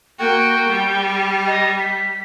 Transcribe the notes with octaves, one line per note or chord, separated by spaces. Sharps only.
A#3 F#4 G5
G3
D#5
B6